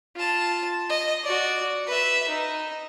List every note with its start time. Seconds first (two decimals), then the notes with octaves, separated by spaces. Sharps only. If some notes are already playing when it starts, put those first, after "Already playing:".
0.16 F4 A5
0.89 D#5
1.23 F#4 D5
1.87 B4 E5
2.29 D#4